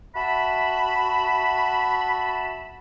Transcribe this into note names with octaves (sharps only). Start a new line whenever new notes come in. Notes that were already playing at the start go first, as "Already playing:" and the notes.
F#4 E5 A5 B5